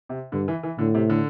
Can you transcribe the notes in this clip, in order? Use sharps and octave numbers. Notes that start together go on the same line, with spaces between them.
C3
G2 D3
E3
E3
A2 D3
C3
D3